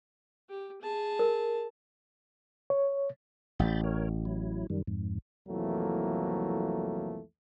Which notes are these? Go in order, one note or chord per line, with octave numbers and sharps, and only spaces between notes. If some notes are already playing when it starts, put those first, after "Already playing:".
G4
G#4 A5
A#4
C#5
A1 B5 G6 A6
A#4 C#5
F#3 E4
F#2 D#3 G3
F2 G#2
C2 F2 E3 F#3 A3 A#3